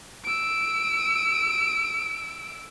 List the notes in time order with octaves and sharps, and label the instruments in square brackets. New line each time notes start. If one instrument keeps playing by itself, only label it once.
[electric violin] E6 D7